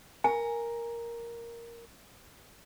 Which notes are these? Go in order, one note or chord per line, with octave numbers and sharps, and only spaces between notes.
A#4 G#5